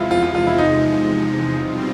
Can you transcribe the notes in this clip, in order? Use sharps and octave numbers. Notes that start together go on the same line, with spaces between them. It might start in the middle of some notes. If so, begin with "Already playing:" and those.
Already playing: E2 C3 F3 G#3 E4 F4
F4
F4
F4
E4
D#4
B2 G3 C4 F4